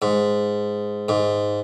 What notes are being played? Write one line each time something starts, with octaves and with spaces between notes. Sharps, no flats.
G#2
G#2